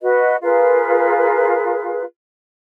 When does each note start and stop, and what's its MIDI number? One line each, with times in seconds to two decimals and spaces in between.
0.01 0.36 66
0.01 0.36 71
0.01 0.36 75
0.42 2.03 65
0.42 2.03 68
0.42 2.03 70
0.42 2.03 71